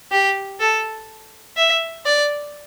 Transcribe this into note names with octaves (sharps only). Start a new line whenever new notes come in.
G4
A4
E5
D5